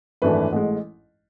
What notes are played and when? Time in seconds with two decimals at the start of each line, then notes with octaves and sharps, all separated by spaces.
0.22 G#1 F#2 E3 A3 D4 B4
0.52 A1 A2 G#3